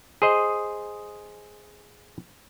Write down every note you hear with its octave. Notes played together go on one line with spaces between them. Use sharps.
G#4 C5 D#5